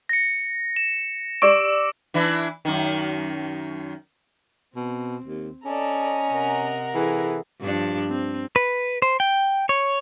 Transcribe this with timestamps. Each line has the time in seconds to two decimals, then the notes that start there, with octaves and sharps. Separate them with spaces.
0.09 A#6 C#7
0.76 E7
1.42 G4 D5 C#6 D6 E6 D7
2.14 E3 D4 E4
2.65 F#2 D#3
4.76 B2 C4
5.24 D#2
5.65 C#4 A4 D5 D#5 A#5
6.31 C3 A#4 F#5
6.94 E3 G#4 A4
7.61 G2 F3 D4
8.10 C4
8.56 B4
9.02 C5
9.20 G5
9.69 C#5